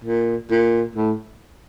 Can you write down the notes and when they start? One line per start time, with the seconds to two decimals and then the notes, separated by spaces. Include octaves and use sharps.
0.04 A#2
0.51 A#2
0.96 A2